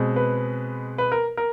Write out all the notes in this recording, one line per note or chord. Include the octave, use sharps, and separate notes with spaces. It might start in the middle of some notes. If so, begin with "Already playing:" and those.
Already playing: B2 G#3 C4
B4
B4
A#4
A#4